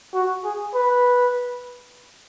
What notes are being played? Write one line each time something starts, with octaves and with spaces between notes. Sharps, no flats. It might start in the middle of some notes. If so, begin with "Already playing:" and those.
F#4
G#4
B4